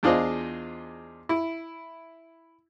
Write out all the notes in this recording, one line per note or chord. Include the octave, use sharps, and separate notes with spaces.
E2 D4 F4 G#4 C5 D#5
E4